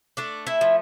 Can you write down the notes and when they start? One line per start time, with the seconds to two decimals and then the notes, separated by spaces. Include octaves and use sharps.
0.17 A3 D4 D5
0.47 E4 E5
0.61 F3